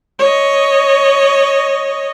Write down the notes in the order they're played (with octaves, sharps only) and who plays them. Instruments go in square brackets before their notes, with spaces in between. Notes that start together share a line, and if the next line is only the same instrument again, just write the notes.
[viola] C#5 D#5